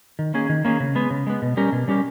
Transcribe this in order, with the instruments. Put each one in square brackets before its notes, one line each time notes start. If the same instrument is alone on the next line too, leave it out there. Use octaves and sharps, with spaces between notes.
[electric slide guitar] D#3
A#3 C#4 G#4
D#3
A#3 C#4 G#4
C#3
G#3 B3
C#3
G#3 B3
B2
G3 C#4 G4 A#4
B2
G3 C#4 G4 A#4